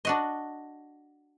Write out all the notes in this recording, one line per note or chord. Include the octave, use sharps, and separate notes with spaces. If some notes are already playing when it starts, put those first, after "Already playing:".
D4 F#4 D#5